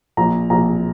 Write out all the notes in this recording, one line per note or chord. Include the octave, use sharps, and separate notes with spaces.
A#1 A#5
A#1 A#5